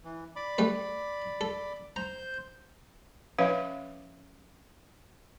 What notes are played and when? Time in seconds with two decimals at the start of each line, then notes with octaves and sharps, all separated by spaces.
0.04 E3
0.36 D5 B5 D6
0.58 G3 A3 B4
1.41 A4
1.96 C5 A#5 G6
3.39 F3 C#4 B4 C#5 E5 F5